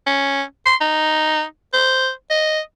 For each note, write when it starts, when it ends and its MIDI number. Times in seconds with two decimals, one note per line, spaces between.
0.06 0.42 61
0.66 0.75 84
0.81 1.43 63
1.73 2.09 72
2.30 2.60 75